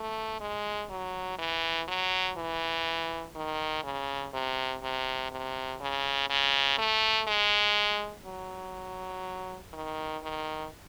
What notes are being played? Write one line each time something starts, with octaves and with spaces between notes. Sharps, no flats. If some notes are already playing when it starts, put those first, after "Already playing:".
Already playing: A3
G#3
F#3
E3
F#3
E3
D#3
C#3
C3
C3
C3
C#3
C#3
A3
G#3
F#3
D#3
D#3